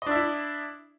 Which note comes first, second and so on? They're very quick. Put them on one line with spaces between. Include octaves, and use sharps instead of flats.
D#5 D4 E5 E4